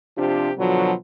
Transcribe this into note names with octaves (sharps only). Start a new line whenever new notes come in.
C3 F3 D4 F4 G4
B2 D3 F3 F#3